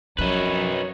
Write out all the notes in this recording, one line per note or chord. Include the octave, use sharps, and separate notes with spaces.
F#2 F3 D#4 B4 C#5